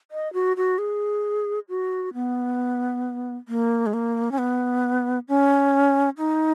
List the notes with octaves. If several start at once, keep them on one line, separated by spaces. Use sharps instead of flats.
D#5
F#4
F#4
G#4
F#4
B3
A#3
G#3
A#3
C#4
B3
C#4
D#4